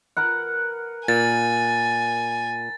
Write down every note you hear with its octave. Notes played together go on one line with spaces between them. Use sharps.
A#4 B4 F#5
A#2 G#5 A6